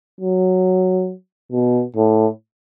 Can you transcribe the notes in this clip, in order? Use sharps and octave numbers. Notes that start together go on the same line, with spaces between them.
F#3
B2
A2